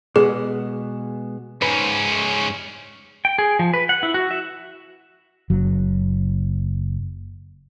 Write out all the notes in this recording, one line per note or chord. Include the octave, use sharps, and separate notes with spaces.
B2 G#3 B3 G#4
G#2 C#4 B4
G5
G#4
F3
B4
F#5
E4
F#4
E5
F#1 F#3